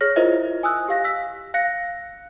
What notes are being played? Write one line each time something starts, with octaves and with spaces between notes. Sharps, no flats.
G#4 C#5 F6 A#6
E4 F4 A#4 C5 D#5 E5
G#5 D#6 E6 F#6
G4 F5 A#6
E6 B6
F5 F#6 A#6 C#7